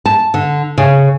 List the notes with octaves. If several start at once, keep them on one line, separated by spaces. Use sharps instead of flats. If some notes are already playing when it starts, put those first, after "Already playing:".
A5
D3
C#3